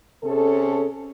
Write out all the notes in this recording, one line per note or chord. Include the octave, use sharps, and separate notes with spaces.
C3 C#4 G#4 A4